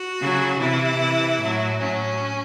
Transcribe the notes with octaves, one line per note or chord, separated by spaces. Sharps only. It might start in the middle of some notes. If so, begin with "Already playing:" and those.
Already playing: F#4
C#3 F#3
C3 E3 E4
C3 E3
A2 F#3
A2 F#3 C#4